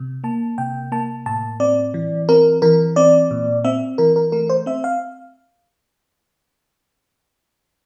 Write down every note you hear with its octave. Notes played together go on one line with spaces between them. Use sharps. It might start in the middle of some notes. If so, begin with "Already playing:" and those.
Already playing: C3
A#3 A5
C3 G5
A#3 A5
A2 A5
C4 D5
E3
C4 A#4
E3 A#4
C4 D5
A#2
C4 E5
E3 A#4
A#4
A3 A#4
C5
C4 E5
F5